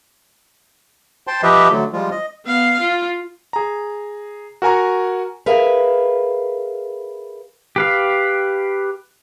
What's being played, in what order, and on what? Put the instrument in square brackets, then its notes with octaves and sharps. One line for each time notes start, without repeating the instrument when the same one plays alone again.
[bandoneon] C5 G5 A5 C6
F3 G4 B4 D#5 E5
D3 F#3 A3
F3 G3 G#3 F4
D#5
[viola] B3 F5
F4
[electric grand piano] G#4 A#5
F#4 A#4 G#5 A#5 C#6
[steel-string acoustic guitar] G#4 A#4 B4 E5 F5
[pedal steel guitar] G4 B4 F5